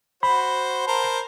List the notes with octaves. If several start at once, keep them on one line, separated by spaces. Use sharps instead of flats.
F#4 C5 B5
A#4 C5 A5